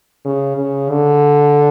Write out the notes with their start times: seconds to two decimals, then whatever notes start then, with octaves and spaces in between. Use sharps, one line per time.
0.25 C#3
0.58 C#3
0.90 D3